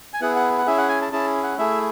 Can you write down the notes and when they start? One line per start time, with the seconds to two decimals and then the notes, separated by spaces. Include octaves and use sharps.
0.14 G#5
0.21 B3 E4 G#4 F#5
0.36 F#5
0.58 F#5
0.66 C#4 E4 G#4 E5
0.78 F#5
0.89 G#5
1.02 A5
1.12 C#4 E4 G#4 A5
1.43 F#5
1.58 A3 E4 G#4 E5